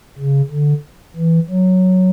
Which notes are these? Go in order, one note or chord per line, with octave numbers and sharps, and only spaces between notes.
C#3
D3
E3
F#3